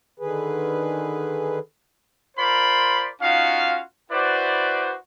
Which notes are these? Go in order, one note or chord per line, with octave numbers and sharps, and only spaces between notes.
D3 D#3 G#4 B4
F4 A#4 C5 D5 B5 C6
C#4 D#4 F4 F#4 F5
E4 F#4 B4 C5 D5